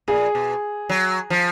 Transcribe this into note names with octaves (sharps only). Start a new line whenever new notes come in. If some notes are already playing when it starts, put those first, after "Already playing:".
A#2 G#4
B2
F#3
F3